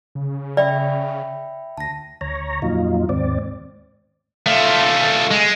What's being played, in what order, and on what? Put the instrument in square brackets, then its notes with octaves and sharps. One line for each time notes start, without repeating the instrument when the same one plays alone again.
[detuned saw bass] C#3
[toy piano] D5 [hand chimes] E5 G5 B5
[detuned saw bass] D2 [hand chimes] A5 A#6
[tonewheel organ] D2 C#5 A#5
F2 A#2 F#3 D#4 F4
D#2 G#2 C4 D5
[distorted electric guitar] A3 F4
G#3